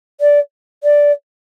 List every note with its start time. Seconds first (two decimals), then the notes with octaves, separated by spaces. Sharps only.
0.21 D5
0.83 D5